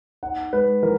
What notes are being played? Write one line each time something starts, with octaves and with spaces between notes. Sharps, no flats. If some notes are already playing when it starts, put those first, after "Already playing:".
D#4 F#5
G#3 B4
E3 A#4